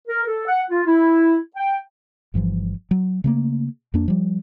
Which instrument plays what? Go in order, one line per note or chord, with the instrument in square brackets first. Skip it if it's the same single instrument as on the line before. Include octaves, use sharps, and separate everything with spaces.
[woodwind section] A#4
A4
F#5
F4
E4
G5
[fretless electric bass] G1 G2 E3 F3
F#3
C#3 A3 A#3
F2 A#3 D4
F3 G3